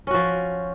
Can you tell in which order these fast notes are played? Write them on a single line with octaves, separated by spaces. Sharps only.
C#4 F#4 F3